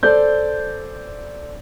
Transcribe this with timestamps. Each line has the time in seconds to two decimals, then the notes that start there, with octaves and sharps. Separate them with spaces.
0.03 A4 C5 D5 G6